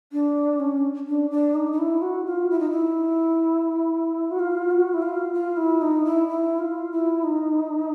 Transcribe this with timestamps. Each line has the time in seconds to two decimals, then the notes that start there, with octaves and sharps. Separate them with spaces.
0.13 D4
0.60 C#4
1.07 D4
1.31 D4
1.55 D#4
1.72 D#4
1.79 E4
2.02 F#4
2.26 F4
2.50 E4
2.60 D#4
2.70 E4
4.31 F#4
4.39 F4
4.71 F#4
4.94 E4
5.02 F4
5.33 F4
5.57 E4
5.81 D#4
6.05 E4
6.29 E4
6.60 F4
6.92 E4
7.24 D#4